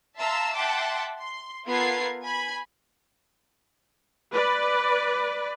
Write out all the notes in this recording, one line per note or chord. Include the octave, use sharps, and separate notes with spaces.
E5 F5 A5 A#5 C6 E6
E5 F#5 G5 A5 C6 D6
C6
B3 F4 A4 A#4 G#6 C7
G#5 B5 G#6
B4 D5